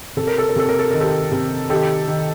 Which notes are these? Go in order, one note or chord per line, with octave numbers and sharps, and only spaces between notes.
C3 A4
A#4
A4
A#4
C3 A4
A#4
A4
D#3 A#4
G4 A4
C3
D#3 G4 A4
D#3